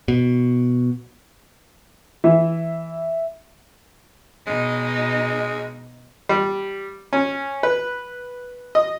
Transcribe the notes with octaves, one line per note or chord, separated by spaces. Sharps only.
B2
E3 E5
B2 G#3 D#4
G3
C#4
B4
D#5